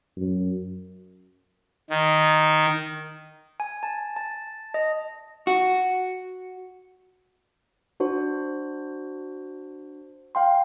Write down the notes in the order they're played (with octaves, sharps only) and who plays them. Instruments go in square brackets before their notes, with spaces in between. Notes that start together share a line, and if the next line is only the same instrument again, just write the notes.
[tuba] F#2
[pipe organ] D#3
[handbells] G#5
A5
A5
D#5
[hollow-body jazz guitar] F#4
[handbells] D4 F#4 C5
F5 G5 C6